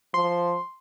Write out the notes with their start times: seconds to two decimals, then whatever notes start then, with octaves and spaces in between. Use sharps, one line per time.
0.14 F3 C6